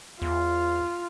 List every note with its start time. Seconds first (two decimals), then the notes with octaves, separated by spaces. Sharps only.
0.22 E2 F4